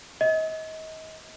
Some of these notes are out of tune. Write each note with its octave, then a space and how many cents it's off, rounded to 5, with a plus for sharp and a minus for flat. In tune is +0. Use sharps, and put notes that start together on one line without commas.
D#5 +35